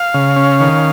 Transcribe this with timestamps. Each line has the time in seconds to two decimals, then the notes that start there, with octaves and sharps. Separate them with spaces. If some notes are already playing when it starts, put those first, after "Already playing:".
Already playing: F5
0.14 C#3
0.36 C#4
0.60 D#3